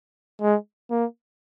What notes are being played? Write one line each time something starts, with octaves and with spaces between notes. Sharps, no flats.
G#3
A#3